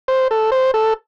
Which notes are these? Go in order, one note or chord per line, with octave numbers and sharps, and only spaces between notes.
C5
A4
C5
A4